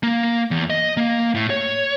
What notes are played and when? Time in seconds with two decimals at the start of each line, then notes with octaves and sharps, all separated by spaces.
0.03 A#3
0.51 E2
0.70 D#5
0.97 A#3
1.35 A2
1.50 C#5